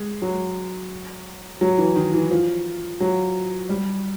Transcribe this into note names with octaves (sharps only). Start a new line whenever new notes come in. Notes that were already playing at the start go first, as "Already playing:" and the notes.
Already playing: G#3
F#3
F#3
E3
D#3
E3
F3
F#3
G3